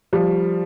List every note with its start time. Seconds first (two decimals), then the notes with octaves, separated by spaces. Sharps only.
0.13 F3 G3